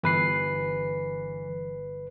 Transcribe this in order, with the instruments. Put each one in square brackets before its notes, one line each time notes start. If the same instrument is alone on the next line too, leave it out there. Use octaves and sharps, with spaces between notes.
[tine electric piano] G1 B4 C7 [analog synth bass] E3